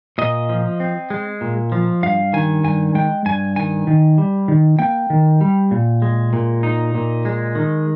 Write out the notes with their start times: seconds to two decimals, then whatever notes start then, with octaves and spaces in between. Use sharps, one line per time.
0.18 A#2 D#5
0.49 F3
0.80 C4
1.10 G#3
1.41 A#2
1.72 F3
2.03 G2 F5
2.33 D#3 G#5
2.64 G2 G#5
2.95 G#3 G5
3.26 G2 G#5
3.56 D#3 G#5
3.87 D#3
4.18 G3
4.48 D#3
4.79 A#3 G5
5.10 D#3
5.41 G3
5.71 A#2
6.02 G#3
6.33 A#2
6.63 D#4
6.95 A#2
7.25 G#3
7.55 D#3